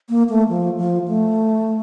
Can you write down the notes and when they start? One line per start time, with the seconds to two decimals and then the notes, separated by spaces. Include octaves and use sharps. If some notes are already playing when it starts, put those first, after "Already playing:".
0.09 A#3
0.30 A3
0.49 F3
0.78 F3
1.08 A3